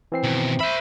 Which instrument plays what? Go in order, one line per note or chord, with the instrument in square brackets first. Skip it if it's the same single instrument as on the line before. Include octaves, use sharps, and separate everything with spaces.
[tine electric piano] E3 C4 C7
[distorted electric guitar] B2 D#3
[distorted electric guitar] C5 B5 [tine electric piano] E5 E6